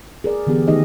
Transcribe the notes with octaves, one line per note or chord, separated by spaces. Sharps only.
G#4 A#4 D5
D3 E3 B3 G4 G#4
D#3 A3 D#4 G4 G#4 D#5